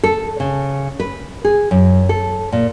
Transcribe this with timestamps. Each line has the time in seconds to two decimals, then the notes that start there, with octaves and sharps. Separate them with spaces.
0.04 A4
0.40 C#3
1.00 B4
1.45 G#4
1.71 F#2
2.09 A4
2.52 A#2